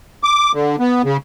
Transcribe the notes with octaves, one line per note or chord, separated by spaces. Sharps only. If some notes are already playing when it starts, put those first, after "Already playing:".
D6
D3
B3
C#3